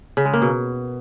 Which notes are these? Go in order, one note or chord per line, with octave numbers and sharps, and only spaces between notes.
C#3
G#3
A#3
B2